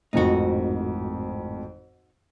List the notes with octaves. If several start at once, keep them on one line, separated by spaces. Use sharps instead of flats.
G#1 F2 A2 D#4 F#4